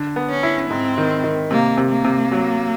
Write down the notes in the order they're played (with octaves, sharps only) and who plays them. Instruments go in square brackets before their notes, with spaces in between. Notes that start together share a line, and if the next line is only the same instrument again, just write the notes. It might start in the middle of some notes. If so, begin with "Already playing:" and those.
Already playing: [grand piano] D3
B3
[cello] C#4
[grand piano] E4
[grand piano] G#2 [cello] C4
[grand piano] D#3
D#3
[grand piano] C3 [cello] A#3
[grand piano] C3
[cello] A#3
[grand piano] C3
F#3